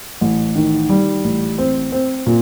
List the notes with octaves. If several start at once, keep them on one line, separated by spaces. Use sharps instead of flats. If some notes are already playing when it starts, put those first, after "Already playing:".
A1
D#3
G3
A1
C4
C4
A#2